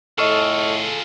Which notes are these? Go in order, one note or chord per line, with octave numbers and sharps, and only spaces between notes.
A2 F4 G#4 A4 D#5 C#6 F6